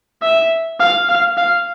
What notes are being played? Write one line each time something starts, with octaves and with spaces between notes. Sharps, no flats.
E5
F5
F5
F5